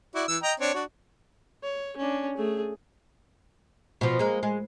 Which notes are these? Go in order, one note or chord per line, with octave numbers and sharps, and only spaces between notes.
E4 F#4 D5
E3 E6
D#5 G5 A#5
C4 D4 C#5
D4 F#4
C#5
C#4 D4
A3 G#4
B2 F3
G#3 A#3
G#3